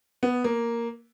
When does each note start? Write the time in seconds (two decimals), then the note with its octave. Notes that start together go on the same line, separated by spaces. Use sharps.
0.23 B3
0.44 A#3